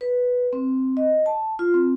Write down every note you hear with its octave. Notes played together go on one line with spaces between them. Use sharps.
B4
C4
D#5
A5
F4
C4